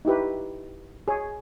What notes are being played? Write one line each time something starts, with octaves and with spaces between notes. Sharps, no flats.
D#4 E4 G4 B4
G#4 C#5